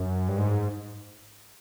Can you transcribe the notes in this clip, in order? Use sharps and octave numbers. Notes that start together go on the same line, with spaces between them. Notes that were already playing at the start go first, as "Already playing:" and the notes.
Already playing: F#2
G2
G#2